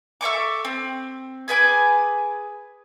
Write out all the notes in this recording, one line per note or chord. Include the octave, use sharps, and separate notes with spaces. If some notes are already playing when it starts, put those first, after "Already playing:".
A4 E5 C#6 D6
C4
G#4 B4 G#5 D6